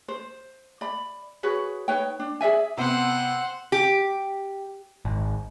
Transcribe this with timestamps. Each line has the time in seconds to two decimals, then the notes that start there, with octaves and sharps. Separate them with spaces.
0.08 C5
0.81 D5 B5
1.43 F#4 G#4 B4 C#5
1.88 D#4 B4 C#5 G5
2.20 D4
2.41 G#4 D5 E5 G#5
2.77 C3 B3 C5 F#5
3.72 G4
5.05 G#1